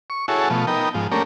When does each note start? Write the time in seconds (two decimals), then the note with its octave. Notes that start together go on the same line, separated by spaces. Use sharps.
0.10 C#6
0.28 E4 F#4 G#4 A4 C#5
0.50 B2 F3 A3
0.67 B3 D#4 A#4 G5
0.95 G#2 F3
1.11 A3 A#3 C#4 D4 G4 A#4